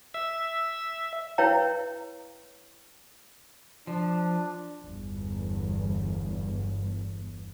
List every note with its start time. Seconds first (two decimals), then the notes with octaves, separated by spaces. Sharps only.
0.14 E5
1.38 E4 B4 C#5 F5 G5 A#5
3.87 F3 D4
4.82 G1 E2 G2